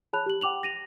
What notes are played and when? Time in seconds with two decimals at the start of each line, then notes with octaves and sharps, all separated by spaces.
0.13 G#4 C#5 A5 B5 F#6 F7
0.26 G4 F#7
0.41 F#5 G5 D6 F7 F#7
0.63 A#6 D#7 F7